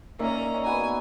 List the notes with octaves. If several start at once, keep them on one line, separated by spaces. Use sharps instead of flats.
A#3 C#4 D#4 D5 E5 A#5
B3 F#4 A#4 G#5